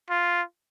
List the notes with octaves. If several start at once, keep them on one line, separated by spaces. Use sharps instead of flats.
F4